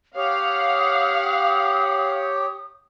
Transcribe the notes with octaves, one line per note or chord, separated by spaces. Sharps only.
G4 C#5 F5 F#5 D#6